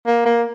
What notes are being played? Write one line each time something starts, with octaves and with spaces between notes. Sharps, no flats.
A#3
A#3